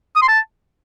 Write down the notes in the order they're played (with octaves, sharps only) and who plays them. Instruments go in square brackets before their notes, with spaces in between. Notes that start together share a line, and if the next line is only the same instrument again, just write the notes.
[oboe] D#6
C6
A5